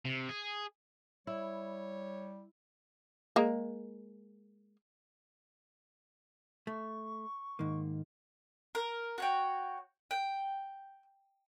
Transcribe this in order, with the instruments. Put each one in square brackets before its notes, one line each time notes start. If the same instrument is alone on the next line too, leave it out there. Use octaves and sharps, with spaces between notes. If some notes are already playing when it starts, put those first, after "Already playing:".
[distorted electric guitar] C3
G#4
[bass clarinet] G3 [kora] E4 [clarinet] C#5
[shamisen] G#3 A#3
[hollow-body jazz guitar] A3 [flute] C#6
[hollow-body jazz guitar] G#2 A#3 [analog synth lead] D#3
[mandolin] A#4
F#4 C#5 G5
G5